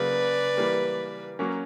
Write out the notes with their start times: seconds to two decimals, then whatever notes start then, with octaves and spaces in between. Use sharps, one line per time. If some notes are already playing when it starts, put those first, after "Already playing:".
Already playing: C#3 F#3 A#3 B4 D5
0.57 E3 G3 A#3
1.39 F#3 A#3 C#4